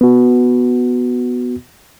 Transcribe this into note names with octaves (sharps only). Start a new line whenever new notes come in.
B3 F#4